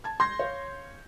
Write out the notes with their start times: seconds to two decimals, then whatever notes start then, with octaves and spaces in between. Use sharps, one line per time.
0.04 A5 G#6
0.20 C6 G6 G#6 A#6
0.39 C#5 F5